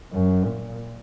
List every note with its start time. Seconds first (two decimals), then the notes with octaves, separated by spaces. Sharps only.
0.12 F#2
0.45 A#2